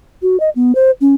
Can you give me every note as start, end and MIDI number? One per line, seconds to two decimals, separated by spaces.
0.22 0.39 66
0.40 0.50 75
0.56 0.75 59
0.75 0.91 72
1.01 1.15 61